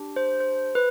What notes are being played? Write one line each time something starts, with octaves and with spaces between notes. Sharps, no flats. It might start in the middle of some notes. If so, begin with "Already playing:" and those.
Already playing: D4 G4
C5
C5
B4